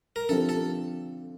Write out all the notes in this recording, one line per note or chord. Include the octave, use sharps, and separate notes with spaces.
A#4
D3 F3 C4 G4 A4
A4